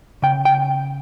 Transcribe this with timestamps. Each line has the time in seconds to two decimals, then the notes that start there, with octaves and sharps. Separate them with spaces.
0.22 C#3 G5
0.45 G5